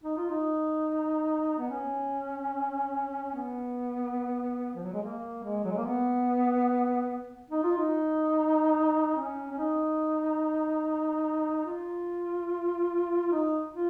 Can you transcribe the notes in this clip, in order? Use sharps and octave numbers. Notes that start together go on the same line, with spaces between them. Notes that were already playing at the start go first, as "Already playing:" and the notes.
D#4
F4
D#4
B3
C#4
B3
F3
F#3
G#3
A#3
G#3
F#3
G#3
A#3
B3
D#4
F4
D#4
C#4
C#4
D#4
F4
D#4
F4